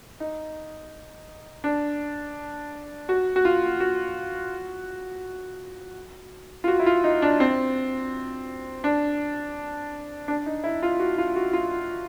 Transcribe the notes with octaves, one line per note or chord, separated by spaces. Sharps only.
D#4
D4
F#4
F#4
F4
F#4
F4
F#4
E4
F4
D#4
D4
C4
D4
D4
D#4
E4
F4
F#4
F4
F#4
F4